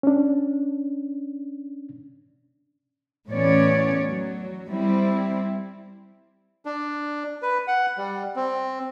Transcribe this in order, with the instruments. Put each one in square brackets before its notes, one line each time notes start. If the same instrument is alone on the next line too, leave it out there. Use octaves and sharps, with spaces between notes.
[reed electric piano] C#4 D4
[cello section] E2 A2 B3 C#4 C#5 D5
F#3
G3 C4 E4
[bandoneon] D4
B4
F#5
G3
C4